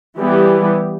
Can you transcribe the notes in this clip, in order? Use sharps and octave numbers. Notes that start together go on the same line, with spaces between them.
E3 G3 B3 G4